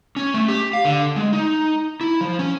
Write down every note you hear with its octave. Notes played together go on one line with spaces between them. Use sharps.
C#4
A3
G4
F5
D3
G#3
D#4
E4
F3
C#4